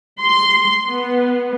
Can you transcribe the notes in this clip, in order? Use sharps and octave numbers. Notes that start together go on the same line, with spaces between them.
C6
B3